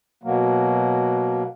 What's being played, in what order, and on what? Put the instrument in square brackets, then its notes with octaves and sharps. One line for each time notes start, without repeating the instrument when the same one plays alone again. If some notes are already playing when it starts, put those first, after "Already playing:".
[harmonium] B2 F#3 A#3